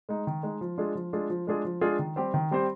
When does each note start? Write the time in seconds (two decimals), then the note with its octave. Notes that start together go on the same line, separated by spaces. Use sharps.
0.09 G#3 D#4
0.27 D#3
0.43 G#3 D#4
0.61 F3
0.78 G#3 D4 F4 G#4
0.95 F3
1.13 G#3 D4 F4 G#4
1.30 F3
1.47 G#3 D4 F4 G#4
1.65 F3
1.81 G#3 D4 F4 G#4
1.99 D#3
2.16 G3 C4 G4 C5
2.34 D#3
2.51 G3 C4 G4 C5